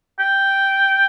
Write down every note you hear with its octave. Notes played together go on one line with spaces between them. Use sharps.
G5